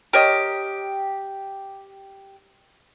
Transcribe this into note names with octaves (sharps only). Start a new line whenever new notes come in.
G4 A#4 C#5 D#5